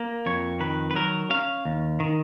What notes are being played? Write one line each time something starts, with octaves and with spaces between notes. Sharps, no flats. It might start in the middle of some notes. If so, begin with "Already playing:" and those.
Already playing: A#3
F2 C#5
D#3 B4
B4
F#3 A#4
C#4 F5
D#2
D#3